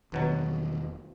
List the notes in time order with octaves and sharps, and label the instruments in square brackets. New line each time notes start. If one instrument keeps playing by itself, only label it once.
[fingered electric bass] E1 D#3 [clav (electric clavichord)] D2 B2 F#3